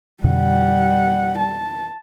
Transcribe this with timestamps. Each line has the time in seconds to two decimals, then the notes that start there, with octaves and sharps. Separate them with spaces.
0.24 F2 B2 D3 G3 F#5
1.39 A5